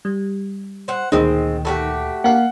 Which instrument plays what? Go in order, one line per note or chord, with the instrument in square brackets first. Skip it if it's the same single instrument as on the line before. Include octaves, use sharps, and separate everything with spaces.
[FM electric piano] G3
[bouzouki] C5 F#5
[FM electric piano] D2 A#2 [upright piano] D#3 [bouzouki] G#3 C4
[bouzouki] A3 F#4 G4
[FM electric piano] A#3 A#4 F5 [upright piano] F#5